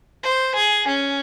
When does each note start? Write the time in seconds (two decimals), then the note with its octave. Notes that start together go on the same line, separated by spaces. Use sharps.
0.23 C5
0.55 G#4
0.88 C#4